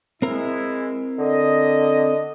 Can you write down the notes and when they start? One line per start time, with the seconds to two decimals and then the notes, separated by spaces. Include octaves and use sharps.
0.22 G#3 C4 E4 A#4
1.19 D3 D#5